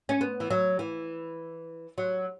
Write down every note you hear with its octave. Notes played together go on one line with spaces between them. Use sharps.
C#4
B3
E3
F#3
E3
F#3